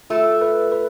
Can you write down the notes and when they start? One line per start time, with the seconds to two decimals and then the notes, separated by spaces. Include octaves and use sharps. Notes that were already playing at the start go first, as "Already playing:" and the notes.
0.10 A3 F4
0.41 B4
0.72 B4